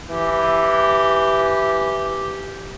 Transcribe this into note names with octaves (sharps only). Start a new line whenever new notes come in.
E3 G4